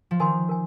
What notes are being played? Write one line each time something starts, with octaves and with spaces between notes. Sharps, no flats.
F3
D#3 A#4 G#5 C6
A#4 G#5